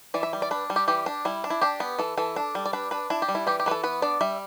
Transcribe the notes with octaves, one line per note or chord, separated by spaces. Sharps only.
E3 D5
E5
G3
D5
D4 B4
G3
G4
E3 G4
D4
G3 E4
D4
E4
D4 G4
B3
E3 A4
E3 A4
D4
G3
D5
D4 B4
D4 B4
D4 E4
G4
G3
E4
E3 G4
G4
E3 B4
A4
B3 B4
D4 D5
G3 E5